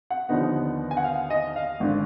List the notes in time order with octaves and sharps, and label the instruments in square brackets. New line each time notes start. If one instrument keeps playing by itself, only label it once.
[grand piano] F#5
D#2 D3 F3 B3 D#4
G#5
F#5
F5
D#5
F5
G#1 D3